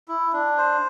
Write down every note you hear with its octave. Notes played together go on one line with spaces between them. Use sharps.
E4
D4
C5